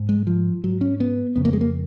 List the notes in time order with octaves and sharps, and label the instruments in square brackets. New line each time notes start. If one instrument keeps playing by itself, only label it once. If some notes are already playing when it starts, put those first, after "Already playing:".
Already playing: [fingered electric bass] G#2
G#3
F3
G#2 F#3
C#4
B3
F2 C#3 B3
A#3
G#3
A#3